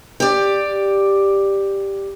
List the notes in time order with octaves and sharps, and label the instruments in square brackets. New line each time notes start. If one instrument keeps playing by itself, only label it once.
[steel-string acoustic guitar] G4 D5